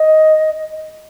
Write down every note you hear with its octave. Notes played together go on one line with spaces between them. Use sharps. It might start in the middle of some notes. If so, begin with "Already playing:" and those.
Already playing: D#5